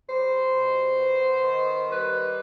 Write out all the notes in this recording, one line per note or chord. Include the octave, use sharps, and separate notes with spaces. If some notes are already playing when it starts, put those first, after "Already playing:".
G3 C5
B2
B3
D#3
G3 B4